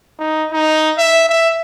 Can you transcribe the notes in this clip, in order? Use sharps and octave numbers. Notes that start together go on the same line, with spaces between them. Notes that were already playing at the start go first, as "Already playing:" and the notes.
D#4
D#4
E5
E5